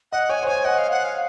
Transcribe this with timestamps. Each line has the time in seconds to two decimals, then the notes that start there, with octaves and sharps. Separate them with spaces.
0.12 D#5 F#5
0.29 C#5 G#5
0.43 C5
0.47 C#5 G#5
0.65 D#5 F#5
0.78 F5
0.91 F#5
1.05 F5